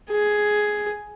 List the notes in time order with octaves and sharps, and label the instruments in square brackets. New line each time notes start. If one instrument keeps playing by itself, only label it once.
[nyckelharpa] G#4